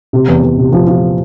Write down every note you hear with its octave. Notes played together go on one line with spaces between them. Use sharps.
C3
E2
E2
C3
F3
F3